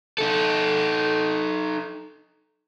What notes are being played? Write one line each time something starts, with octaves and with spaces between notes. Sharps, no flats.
D#4 A4